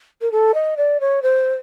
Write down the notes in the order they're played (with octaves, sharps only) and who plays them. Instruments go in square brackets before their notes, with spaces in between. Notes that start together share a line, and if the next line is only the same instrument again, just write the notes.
[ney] A#4
A4
D#5
D5
C#5
C5